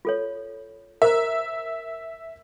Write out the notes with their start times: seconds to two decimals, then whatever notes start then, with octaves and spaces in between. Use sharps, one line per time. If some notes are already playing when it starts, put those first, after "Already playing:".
0.05 F4 A4 C#5
1.02 A#4 C5 E5 A#5 E6